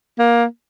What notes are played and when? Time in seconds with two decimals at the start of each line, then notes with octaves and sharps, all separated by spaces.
0.19 A#3